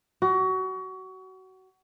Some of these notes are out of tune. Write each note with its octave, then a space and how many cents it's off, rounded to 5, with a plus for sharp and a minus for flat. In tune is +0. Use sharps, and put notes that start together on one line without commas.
F#4 +25